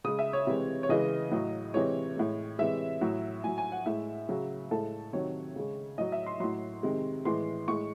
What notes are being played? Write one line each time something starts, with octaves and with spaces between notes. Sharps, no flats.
C#3 G#3 D#6
E5
C#5
C3 E3 G#3
C#5
C#3 E3 G#3 D#5
A2 F#3
C3 E3 G#3 C#5
A2 G#3
C3 E3 G#3 E5
A2 F#3
A2 F#3 G#5
G#5
F#5
A2 G#3 E5
C#3 F#3
A2 G#3 A4
C3 D#3 F#3 C#5
C#3 G#3
A2 F#3 D#5
E5
C6
A2 F#3 C6
C3 D#3 G#3
A2 E3 G#3 C6
A2 G#3 C#6